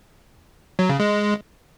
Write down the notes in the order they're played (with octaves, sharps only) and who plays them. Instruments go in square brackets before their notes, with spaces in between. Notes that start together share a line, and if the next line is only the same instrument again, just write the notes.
[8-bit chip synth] F#3
C#3
G#3